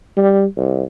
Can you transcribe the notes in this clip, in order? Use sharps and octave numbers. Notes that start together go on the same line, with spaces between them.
G3
C2